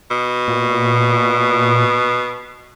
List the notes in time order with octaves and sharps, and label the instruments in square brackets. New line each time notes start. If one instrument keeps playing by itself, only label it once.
[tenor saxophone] B2
[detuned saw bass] A#2